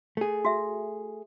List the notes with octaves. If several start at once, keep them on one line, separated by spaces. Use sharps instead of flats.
A3 G#4
F#4 E5